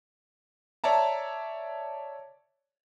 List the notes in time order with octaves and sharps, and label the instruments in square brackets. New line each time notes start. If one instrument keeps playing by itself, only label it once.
[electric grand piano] C#5 D5 E5 A5 A#5